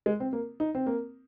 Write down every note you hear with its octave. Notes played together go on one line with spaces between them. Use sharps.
G#3
C4
A#3
D#4
C4
A#3